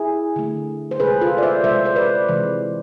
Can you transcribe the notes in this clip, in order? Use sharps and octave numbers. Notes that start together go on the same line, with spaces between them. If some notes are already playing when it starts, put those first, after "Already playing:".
Already playing: E4 G#4
D3 A3
C5
C3 G#3 G#4 B4
F4 A4
D5
C5 E5
C3 G#3 C5 E5
C5
B4 D5
C3 E3 G#3